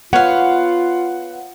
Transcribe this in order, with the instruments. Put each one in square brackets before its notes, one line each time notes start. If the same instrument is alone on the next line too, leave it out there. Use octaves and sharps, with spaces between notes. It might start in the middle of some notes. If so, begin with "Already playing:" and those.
[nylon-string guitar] B3 [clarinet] F4 [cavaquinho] C#5 F5 [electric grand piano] F#5